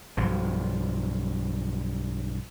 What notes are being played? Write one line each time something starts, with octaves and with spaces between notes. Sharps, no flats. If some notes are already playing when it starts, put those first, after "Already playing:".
B1 G2 F3